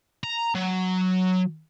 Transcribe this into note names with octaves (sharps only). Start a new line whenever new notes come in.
A#5
F#3